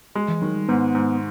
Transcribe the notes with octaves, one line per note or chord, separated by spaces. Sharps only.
G#3
E3
D#3 F#3
G3
G#2 B3
G#2